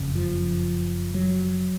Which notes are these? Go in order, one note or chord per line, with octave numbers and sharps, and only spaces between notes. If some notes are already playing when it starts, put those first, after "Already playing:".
Already playing: F#1 F2 C#3
F3
F#3